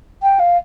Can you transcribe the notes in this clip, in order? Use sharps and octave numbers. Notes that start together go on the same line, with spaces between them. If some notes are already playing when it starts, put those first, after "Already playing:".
G5
F5